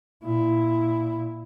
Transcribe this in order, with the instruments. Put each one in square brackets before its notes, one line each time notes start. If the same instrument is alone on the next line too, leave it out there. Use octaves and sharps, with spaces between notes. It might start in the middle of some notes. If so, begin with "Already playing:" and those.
[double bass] A#2 E4